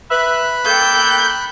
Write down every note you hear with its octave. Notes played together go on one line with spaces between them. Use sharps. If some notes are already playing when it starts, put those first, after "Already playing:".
B4 E5 B5 F#6
A#3 A4 G5 G6